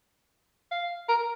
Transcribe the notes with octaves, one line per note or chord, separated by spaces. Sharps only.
F5
A#4